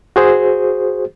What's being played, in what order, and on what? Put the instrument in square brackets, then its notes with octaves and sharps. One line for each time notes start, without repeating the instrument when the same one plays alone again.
[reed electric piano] F#4 G#4 C5